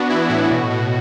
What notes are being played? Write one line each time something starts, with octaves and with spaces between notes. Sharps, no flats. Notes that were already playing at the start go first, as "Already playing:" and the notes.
Already playing: B3 D4 F#4
E3 E4
A2 F#4
B2
B2